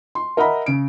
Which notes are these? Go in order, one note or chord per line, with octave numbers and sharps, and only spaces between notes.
C6
A#4 D#5 E5 F#5 A#5 B5
C#3 D7